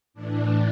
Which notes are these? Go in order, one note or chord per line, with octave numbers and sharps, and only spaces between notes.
A2 E3 D4